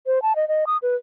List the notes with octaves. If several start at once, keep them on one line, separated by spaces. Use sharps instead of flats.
C5
A5
D#5
D#5
D#6
B4